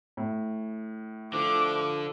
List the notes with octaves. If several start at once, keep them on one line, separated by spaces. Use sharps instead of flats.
A2
D3 F3 D6